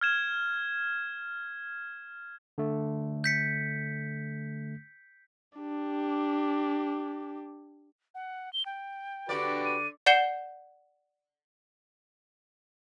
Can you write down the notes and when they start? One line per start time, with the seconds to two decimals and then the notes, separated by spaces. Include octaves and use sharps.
0.01 F6 G#6 E7
2.58 D3 A3
3.24 G6 B6 C#7
5.58 D4 G4
8.15 F#5
8.53 G7
8.66 G5
9.29 D3 F#4 G4 B4 D5
9.65 D#7
10.06 D5 F#5 G6 C7 E7 G7